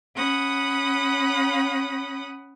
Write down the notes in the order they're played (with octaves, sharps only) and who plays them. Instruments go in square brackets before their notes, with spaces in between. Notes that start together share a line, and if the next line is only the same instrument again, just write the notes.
[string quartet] C#4 F#5 B5 D#6